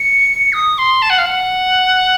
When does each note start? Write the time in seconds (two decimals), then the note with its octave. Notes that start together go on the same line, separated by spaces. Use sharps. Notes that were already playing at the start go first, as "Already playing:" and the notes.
Already playing: C#7
0.53 D#6
0.78 C6
1.02 A5
1.10 F#5
1.18 F5
1.26 F#5